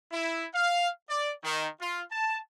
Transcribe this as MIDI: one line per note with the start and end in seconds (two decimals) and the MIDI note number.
0.12 0.45 64
0.54 0.88 77
1.10 1.32 74
1.43 1.67 51
1.81 2.02 65
2.12 2.39 81